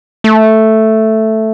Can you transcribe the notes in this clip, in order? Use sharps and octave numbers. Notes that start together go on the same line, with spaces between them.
A3